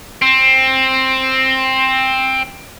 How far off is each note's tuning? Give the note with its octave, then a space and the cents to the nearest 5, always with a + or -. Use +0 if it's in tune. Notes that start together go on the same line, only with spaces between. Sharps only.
C4 +10